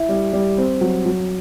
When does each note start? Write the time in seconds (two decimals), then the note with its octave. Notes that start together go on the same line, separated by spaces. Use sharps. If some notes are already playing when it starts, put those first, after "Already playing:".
Already playing: E4
0.09 G3
0.33 G3
0.57 C4
0.81 F#3
1.06 F#3